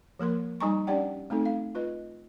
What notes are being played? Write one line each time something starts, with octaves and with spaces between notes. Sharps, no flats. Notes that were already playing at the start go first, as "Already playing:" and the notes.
F3 A#3 A#4 C6
G3 D#4 D#5 G#5 A#5 C#6
C#4 D4 G4 D5 F#5 G5
A3 C4 D#4 A4
F5
F4 B4 D#5